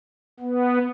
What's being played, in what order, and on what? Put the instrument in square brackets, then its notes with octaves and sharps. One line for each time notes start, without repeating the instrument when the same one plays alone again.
[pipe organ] B3